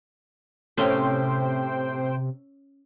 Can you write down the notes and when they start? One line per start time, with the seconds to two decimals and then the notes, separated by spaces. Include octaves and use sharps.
0.78 A2 C3 C#4 C5 G5 C6